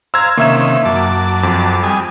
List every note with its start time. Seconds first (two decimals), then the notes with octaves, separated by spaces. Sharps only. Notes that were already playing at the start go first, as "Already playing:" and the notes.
0.14 C5 F5 A#5 E6 G#6
0.37 C3 D#3 A#3 C#4 E5 E7
0.85 F#2 A5 D6
1.43 F2
1.83 G3 G#5 D#6